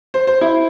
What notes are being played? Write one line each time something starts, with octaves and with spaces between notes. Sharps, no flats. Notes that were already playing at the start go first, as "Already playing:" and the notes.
C5
C5
E4